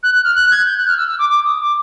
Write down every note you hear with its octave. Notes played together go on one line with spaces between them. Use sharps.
F#6
F#6
F6
F#6
G#6
G6
F#6
F6
E6
E6
D6
D6
D#6
D6